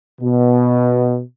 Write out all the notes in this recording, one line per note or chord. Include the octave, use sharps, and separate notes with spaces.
B2